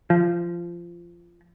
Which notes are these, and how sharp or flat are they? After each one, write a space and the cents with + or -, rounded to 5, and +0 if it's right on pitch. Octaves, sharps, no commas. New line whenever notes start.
F3 -20